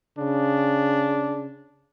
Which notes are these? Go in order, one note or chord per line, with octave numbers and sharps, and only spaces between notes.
C#3 D4